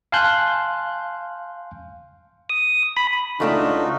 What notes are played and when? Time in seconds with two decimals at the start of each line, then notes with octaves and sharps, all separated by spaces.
0.12 F5 G#5 A5 C6 F#6 G6
2.50 D#6
2.97 B5
3.40 C#2 A3 D4 D#4 F4 F#4